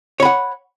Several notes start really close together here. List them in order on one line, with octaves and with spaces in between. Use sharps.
C#5 B5 F#5